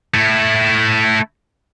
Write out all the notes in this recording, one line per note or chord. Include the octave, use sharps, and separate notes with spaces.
A3 E4